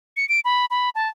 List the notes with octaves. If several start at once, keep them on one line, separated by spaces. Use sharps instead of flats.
C#7
D7
B5
B5
A5